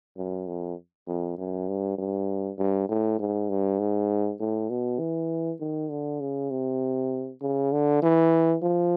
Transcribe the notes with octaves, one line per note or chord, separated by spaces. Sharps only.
F#2
F2
F2
F#2
G2
G2
G2
A2
G#2
G2
G#2
A2
B2
E3
D#3
D3
C#3
C3
C#3
D3
E3
F3